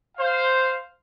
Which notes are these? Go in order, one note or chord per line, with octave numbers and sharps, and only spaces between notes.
C5 F5